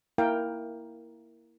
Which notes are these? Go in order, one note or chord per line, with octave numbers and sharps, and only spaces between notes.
A#3 E4 A#4 F5 G5